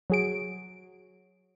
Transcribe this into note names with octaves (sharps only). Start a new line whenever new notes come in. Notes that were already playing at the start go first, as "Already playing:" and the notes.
F#3 G#4 D7